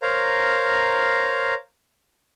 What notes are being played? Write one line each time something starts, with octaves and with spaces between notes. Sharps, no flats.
A#4 C5 C#5 F5 A#5